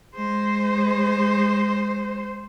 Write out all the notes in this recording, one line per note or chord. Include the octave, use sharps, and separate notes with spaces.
G#3 C5